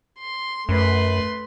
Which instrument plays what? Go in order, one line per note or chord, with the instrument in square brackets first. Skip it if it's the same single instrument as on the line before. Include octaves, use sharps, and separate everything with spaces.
[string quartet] C6
[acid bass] F#2 [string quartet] A3 B4 C6